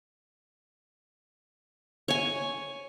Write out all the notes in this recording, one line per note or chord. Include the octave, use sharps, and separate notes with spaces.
C#5 G#5